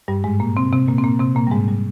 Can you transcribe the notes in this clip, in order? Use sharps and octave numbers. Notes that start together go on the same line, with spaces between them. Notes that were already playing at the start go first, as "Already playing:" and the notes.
G2 G3
G#2 G#3
A#2 A#3
C3 C4
C3 C4
A#2 A#3
C4
A#2 A#3
C3 C4
A#2 A#3
G3
G#2 G#3
G3